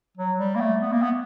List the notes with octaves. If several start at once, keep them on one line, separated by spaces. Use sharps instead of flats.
F#3
G3
A#3
A3
B3
A#3
B3